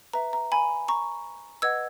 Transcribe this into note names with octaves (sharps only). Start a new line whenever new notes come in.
B4 E5 A#5
A#5
G#5 B5
A#5 C#6
B4 D#5 F#5 E6 G#6